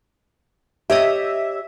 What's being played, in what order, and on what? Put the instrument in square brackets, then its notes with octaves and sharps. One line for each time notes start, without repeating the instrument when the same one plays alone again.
[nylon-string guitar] G4 C#5 D#5 [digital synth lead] E5